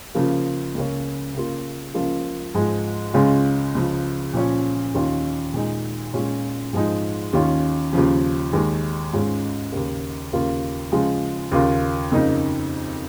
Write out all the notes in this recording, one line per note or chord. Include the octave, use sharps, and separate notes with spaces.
C#3 F3 A#3
C#2 C#3 A#3 C#4
C#3 A#3 F4
C#2 C#3 F3 A#3 F4
G#2 F3 G#3
C#2 C#3 G#3 C#4 F4
C#2 C#3 F3
A#2 F3 C#4
D#2 D#3 C#4 F4
A#2 G#3 D#4
A#2 G#3 C#4 F4
G#2 F3 G#3 D#4
D#2 D#3 C#4 F4
D#2 C#3 F3
D#2 D#3 G#3
G#2 G#3 C#4 F4
D#2 C#3 A#3
D#2 C#3 A#3 F4
C#3 F3 G#3 F4
D#2 C#3 A#3 F4
F2 C#3 A#3 D#4